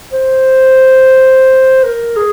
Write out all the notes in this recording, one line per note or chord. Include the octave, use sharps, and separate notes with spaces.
C5
A#4
G#4